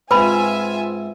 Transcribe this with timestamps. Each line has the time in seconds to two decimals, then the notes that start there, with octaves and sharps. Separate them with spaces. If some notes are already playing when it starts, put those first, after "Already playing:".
0.11 G#2 C4 F4 B4 E5 G#5 B5